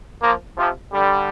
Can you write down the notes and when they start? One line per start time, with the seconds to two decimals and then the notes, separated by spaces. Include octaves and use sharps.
0.23 F3 A#3
0.58 C3 F3
0.92 D3 G3